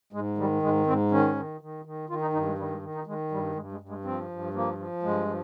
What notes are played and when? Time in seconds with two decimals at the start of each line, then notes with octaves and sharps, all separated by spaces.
0.13 G#2 G#3
0.37 D#3 G3
0.62 G#2 G#3
0.86 G#2 C4
1.11 D#3 C#4
1.35 D#3
1.61 D#3
1.85 D#3
2.09 D#3 F4
2.21 D#4
2.33 G2 D#4
2.46 G#3
2.58 D#3 G3
2.70 G#3
2.82 D#3
2.95 D#4
3.06 D#3 G#3
3.31 G2 G3
3.55 G2 G#3
3.72 G#3
3.80 G2
3.89 G#3
4.04 F3 C4
4.30 G2
4.53 F3 A#3
4.78 F3
5.03 G2 G#3
5.27 F3